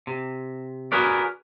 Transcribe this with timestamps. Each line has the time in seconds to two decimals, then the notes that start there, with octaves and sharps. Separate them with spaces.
0.07 C3
0.92 F#4 G#4 A#4 B4 D5